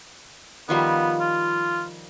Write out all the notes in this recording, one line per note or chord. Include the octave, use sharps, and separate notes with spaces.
D#3 F3 G3 B3
F4